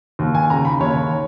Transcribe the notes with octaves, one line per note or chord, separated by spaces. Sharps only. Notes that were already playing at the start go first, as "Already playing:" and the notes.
D#2
G#5
C#3 A#5
B5
D#2 C#5